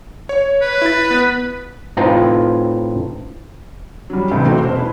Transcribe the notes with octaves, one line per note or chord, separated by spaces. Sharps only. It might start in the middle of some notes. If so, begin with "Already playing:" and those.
C#5
B4
E4 A6
B3
A2 C4 D#4 F4 B4 G5
F#3 G3
D2 A2 C3 E3
A3 A#3 C4 D#4 F#4
E1 C5
E4 B4